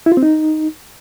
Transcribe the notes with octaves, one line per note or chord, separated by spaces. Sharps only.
E4
F4
C4
D#4